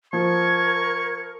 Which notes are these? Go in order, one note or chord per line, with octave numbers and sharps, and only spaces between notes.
F3 A#4 C#6 G#6